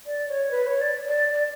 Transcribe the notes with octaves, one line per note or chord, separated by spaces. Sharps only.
D5
C#5
B4
C#5
D5
D5
D5